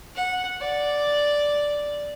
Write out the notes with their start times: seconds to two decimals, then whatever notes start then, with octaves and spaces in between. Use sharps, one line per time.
0.16 F#5
0.61 D5